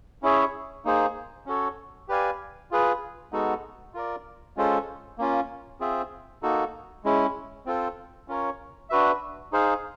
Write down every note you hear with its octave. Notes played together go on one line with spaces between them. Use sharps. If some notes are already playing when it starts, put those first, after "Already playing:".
C#4 E4 G#4 C#5 E5
A#3 D#4 G#4 C5
C#4 F#4 A4 C#5
G4 B4 D5 F5 G#5
F4 G#4 B4
G#3 B3 D#4 F#4 A4
F4 A#4 D5
G#3 C#4 F4 A4 C5
A#3 C#4 F4
C4 F4 G#4 C5 E5
A#3 D#4 F#4 A4
G#3 C#4 E4
C4 F4 A4 C5
C#4 F4 A#4 C#5
D4 F#4 B4 E5
D#4 G#4 C5 F5